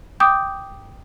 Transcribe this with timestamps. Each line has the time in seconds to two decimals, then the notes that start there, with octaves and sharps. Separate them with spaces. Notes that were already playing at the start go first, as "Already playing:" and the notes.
0.20 G5 D6 D#6 G6